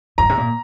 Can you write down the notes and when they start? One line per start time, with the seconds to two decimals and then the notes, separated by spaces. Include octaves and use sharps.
0.18 G2 A#5
0.29 C3
0.37 A#2